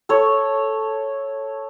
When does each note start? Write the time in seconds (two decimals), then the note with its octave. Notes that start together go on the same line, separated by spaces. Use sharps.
0.09 A4 C#5